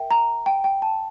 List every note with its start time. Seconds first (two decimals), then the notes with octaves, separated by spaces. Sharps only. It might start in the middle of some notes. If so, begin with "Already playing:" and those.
Already playing: A#4 E5 G5
0.11 A#5
0.46 G5
0.64 G5
0.82 A5